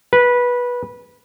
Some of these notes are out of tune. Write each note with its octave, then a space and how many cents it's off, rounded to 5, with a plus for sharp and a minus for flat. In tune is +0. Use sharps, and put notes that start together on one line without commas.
B4 -15